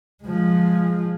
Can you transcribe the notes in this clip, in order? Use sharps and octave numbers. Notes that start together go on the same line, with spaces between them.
F3 G#3